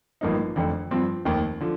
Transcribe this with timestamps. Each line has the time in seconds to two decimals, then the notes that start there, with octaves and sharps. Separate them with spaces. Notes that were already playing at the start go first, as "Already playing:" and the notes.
0.21 A1 G2 F3 A#3 D#4
0.56 F1 F2 D3
0.91 G2 F3 C4
1.25 F1 D#2 D#3
1.60 D3 F3